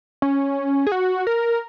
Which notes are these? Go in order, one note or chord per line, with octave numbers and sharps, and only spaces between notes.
C#4
G#4
F#4
A#4